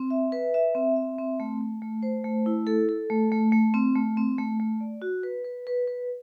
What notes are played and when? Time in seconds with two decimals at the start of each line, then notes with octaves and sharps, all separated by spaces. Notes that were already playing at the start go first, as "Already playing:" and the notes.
Already playing: C4
0.10 E5
0.32 B4
0.54 E5
0.75 C4
0.96 E5
1.18 C4
1.40 A3
1.61 A3
1.82 A3
2.03 C5
2.24 A3
2.46 E4
2.67 A4
2.89 A4
3.10 A3
3.32 A3
3.52 A3
3.74 C4
3.96 A3
4.17 C4
4.38 A3
4.60 A3
4.81 D5
5.02 F#4
5.23 B4
5.44 B4
5.67 B4
5.87 B4